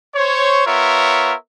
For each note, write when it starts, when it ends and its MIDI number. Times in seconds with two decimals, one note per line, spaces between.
0.15 0.62 72
0.15 0.62 73
0.66 1.33 59
0.66 1.33 65
0.66 1.33 70
0.66 1.33 73
0.66 1.33 76